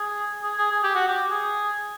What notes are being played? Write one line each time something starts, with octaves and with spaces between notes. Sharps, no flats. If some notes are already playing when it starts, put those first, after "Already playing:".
Already playing: G#4
G#4
G#4
G#4
G4
F#4
G4
G#4